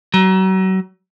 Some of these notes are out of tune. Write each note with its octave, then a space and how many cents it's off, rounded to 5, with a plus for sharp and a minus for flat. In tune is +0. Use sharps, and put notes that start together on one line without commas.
F#3 +35